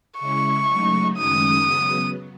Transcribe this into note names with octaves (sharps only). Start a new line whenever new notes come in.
C#3 G#3 C#4 E4 C#6
C#3 F#3 A3 D#4
F#2 D#3 G#3 C#4 D#6
C#3 F#3 B3